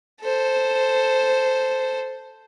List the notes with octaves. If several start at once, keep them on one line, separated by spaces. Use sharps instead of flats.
A4 C5